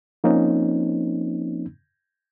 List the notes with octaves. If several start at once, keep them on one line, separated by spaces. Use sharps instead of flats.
F3 A#3 C4 C#4 D#4